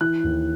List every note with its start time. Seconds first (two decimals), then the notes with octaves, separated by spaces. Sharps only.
0.01 E3 F#6
0.24 D#2